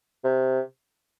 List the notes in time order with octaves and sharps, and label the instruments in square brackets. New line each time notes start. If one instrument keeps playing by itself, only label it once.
[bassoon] C3